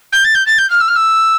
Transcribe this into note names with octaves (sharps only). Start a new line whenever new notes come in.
G6
A6
G6
A6
G6
F6
E6
F6
E6